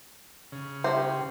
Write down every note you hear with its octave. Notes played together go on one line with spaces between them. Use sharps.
C#3
G4 C5 E5